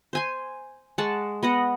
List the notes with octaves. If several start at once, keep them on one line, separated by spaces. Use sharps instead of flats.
C5 G#5 C6
G#3 F#5 A5 C#6
B3 D#5 F#5